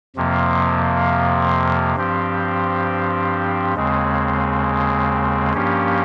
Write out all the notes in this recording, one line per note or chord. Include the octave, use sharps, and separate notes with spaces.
F2 C3 F3 A#3
G2 F3 C4 G4
D#2 C#3 G#3 C4
G2 F3 A#3 C#4 G4